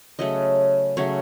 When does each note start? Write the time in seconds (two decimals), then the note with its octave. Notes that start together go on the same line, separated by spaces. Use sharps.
0.19 C#3 F#3 A3 D#5
0.97 C#3 F#3 A3 C#5